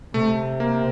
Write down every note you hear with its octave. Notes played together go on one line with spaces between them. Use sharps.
C3 A3
A#3